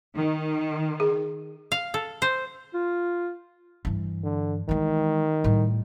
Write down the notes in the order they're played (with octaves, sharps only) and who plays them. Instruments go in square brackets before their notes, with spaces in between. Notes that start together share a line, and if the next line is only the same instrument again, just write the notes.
[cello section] D#3
[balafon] G#4
[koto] F5
A4
C5
[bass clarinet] F4
[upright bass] G2 E3
[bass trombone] D3
[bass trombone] D#3 [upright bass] E3 G#3
[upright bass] A2 G3